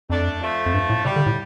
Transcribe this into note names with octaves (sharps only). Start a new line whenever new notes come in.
F2 A3 D4
F3 A3
F2
G2
A2
C3 G3
D3
A2